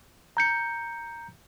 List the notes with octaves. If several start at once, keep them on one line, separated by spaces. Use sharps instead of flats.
A#5 G6 C#7